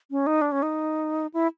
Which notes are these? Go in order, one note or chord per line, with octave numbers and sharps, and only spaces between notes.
C#4
D#4
D4
C#4
D#4
E4